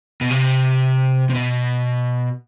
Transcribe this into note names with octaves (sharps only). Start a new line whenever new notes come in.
B2
C3
C3
B2